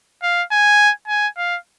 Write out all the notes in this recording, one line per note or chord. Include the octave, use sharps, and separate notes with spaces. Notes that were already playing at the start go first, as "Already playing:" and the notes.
F5
G#5
G#5
F5